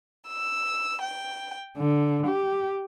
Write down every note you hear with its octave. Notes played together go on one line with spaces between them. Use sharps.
E6
G5
D3
G4